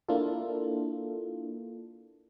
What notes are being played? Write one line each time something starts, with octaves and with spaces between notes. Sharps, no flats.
A#3 D4 E4 F4 A4